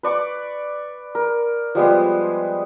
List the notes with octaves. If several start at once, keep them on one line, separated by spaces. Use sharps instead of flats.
B4 D5 C#6 D6
A#4
F3 G3 G#3 B3